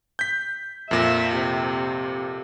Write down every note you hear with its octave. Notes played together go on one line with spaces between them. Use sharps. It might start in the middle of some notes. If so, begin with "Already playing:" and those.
G6 B6
F2 A#2 E5 A#6
C3